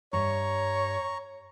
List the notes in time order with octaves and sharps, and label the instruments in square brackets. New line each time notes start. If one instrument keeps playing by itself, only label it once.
[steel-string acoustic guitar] G2 E5 [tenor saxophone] C#5 [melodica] A#5 C#6